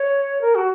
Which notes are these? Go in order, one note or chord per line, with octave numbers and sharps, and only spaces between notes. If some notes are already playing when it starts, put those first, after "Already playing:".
Already playing: C#5
A#4
F#4